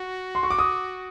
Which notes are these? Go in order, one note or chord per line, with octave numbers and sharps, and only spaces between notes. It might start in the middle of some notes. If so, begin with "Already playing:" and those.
Already playing: F#4
C6
C#6
D6
D#6